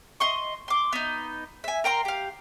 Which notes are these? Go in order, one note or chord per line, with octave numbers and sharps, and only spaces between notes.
D#5 C6 C#6
C6 D6
B3 D#4
E5 G#5
A#4 G5 A#5 C6
G4 F5